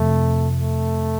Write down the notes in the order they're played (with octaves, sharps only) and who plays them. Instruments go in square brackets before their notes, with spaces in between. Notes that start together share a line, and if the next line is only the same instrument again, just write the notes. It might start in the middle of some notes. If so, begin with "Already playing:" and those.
Already playing: [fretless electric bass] F2 C3 F3 [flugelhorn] A3
[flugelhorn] A3